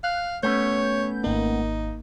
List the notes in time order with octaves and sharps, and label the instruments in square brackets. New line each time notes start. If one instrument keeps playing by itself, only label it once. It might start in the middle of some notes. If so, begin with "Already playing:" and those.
[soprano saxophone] F5 [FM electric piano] F#6
[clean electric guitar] A3 B3 C#4 [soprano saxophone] C#5 [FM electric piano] G6
[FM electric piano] G#1 A#3 [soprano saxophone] D#4